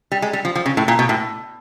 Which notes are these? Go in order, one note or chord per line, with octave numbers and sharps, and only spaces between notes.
G3
G#3
G3
F3
F3
C#3
A2
A#2
B2
A2